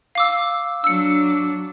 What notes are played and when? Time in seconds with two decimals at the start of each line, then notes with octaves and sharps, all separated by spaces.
0.15 F5 D6 E6
0.84 F#3 D4 E6 C#7